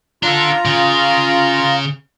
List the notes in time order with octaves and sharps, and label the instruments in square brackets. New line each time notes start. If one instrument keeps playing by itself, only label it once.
[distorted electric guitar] D4 A4 [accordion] F4 A#5
[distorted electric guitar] C#3